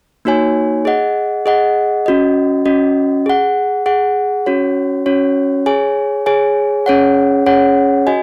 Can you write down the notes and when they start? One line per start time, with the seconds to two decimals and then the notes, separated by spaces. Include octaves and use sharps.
0.25 A#3 D#4 F#4 C#5 G#5
0.85 G#4 D#5 F#5
1.46 G#4 D#5 F#5
2.06 C#4 F#4 D#5
2.65 C#4 F#4 D#5
3.26 G#4 F#5
3.86 G#4 F#5
4.46 C#4 F#4 C#5
5.06 C#4 F#4 C#5
5.66 G#4 C#5 G#5
6.26 G#4 C#5 G#5
6.86 C#4 G#4 C#5 F#5
7.46 C#4 G#4 C#5 F#5
8.07 F#4 D#5 G#5